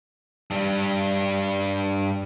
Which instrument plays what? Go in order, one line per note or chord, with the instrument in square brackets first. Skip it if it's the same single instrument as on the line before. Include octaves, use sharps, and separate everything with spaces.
[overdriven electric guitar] G2 G3